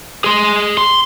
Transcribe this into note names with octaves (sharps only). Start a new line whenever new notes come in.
G#4 C6
C6